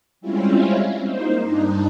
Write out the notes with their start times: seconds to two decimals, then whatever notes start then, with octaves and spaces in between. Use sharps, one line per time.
0.21 G3 G#3 C4 C#4 E4 F4
1.03 A#3 D#4 C5
1.42 G2 D4 D#4